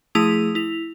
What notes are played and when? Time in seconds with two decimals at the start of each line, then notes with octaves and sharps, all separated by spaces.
0.15 F3 A3 E4 G#4 D#6 F7
0.55 E4 F7